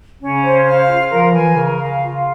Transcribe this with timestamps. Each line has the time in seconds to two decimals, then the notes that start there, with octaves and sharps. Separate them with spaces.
0.21 C#3 C#4
0.43 C5
0.66 F5
0.88 F4
1.10 F3 A#4
1.32 E3 G#5
1.54 C#3 A#4
1.77 F5
1.99 F4